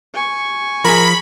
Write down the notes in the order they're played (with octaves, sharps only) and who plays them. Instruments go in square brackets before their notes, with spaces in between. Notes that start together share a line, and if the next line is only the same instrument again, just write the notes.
[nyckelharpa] G#5 C#6
[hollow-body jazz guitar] F3 G#4 [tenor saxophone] A#4 [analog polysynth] B5